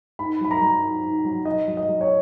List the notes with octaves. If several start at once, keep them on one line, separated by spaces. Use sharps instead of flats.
G#2 B5
F#3 B5
A#5
F#3
G#2
G#2
F#3
G#2 D#5
F#3
D#5
F#3
C#5